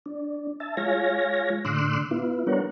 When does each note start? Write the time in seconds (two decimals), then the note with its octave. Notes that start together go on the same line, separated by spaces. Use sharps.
0.06 D4
0.60 E5 A5
0.77 G#3 F4 C#5 F5 G#5 A#6
1.65 A2 D3 C6 D6 E6 F#6
2.11 B3 E4 F4
2.47 G3 B3 D4 A#4 C#5 F#5